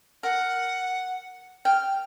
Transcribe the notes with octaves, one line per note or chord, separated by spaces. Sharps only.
A#4 F#5
G5 F6